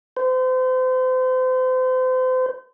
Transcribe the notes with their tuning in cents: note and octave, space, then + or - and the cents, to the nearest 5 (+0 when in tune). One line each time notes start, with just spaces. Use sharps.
C5 -35